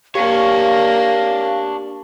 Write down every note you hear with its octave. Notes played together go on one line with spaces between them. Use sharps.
A#3 D4 G4 C#5 F5